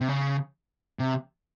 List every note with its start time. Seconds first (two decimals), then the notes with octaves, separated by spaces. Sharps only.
0.01 C3
0.08 C#3
0.99 C3